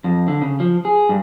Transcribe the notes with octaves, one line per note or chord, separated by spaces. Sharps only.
F2
D3
C#3
F3
G#4
G2